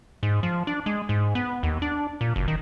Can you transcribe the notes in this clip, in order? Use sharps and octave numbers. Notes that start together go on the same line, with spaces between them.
G#2
F3
D4
G#3
G#2
B3
D#2
D4
A#2
F#1
D#3